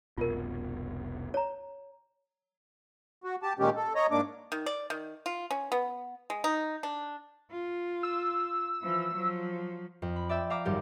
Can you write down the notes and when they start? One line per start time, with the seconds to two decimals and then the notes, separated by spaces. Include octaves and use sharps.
0.17 F1 C2 B2 F4 A#4
1.34 C#5 A#5
3.24 F#4
3.43 G4 A5
3.59 A#2 D#3 G#3 C#4 G4
3.76 A4
3.95 C#5 D#5 A#5
4.11 G#2 A#3 D4 D6
4.52 D#3
4.66 D5
4.90 D#3
5.26 F4
5.51 C#4
5.72 B3
6.30 G#3
6.44 D#4
6.83 D4
7.51 F4
8.03 E6
8.83 E3 F3
9.15 F3 F#3
10.02 F2
10.16 B5
10.29 D5 E5 G5 E6
10.50 E5 F5 A#5 D6
10.65 G#1 F#2 G3 G4